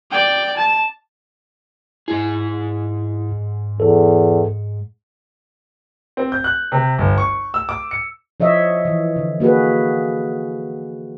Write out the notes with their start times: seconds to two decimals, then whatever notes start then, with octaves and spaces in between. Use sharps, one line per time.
0.11 D5 G5
0.57 A5
2.08 G#2 E4 G#4
3.80 E2 A4
6.17 C4
6.32 G6
6.44 F#6
6.72 C3
6.98 G1
7.18 C#6
7.54 E6
7.69 D6
7.91 C#7
8.40 F3 C#5 D#5 E5
8.85 E3
9.16 D3
9.40 A#3 F#4 G#4 B4